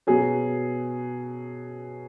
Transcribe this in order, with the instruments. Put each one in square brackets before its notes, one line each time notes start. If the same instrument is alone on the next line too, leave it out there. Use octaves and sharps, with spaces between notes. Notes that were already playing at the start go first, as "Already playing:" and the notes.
[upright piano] B2 F#3 G#4